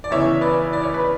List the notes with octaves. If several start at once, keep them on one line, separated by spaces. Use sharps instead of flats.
D5
E2 C#3 E3 C#5 E5
B4 D5
D5
C#5
B4